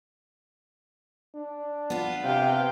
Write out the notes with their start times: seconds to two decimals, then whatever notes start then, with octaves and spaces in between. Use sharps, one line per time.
1.35 D4
1.90 B3 F4
2.24 C3 F5 G5